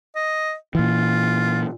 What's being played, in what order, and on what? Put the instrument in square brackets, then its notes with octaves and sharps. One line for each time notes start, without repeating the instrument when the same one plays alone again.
[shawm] D#5
[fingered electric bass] A#2 E3 [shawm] F4